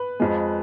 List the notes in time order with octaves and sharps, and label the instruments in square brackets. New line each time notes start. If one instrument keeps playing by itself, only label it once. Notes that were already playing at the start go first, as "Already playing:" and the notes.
Already playing: [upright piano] B4
F2 F3 G#3